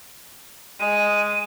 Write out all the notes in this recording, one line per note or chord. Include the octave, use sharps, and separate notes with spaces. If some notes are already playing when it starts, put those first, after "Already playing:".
G#3 D#7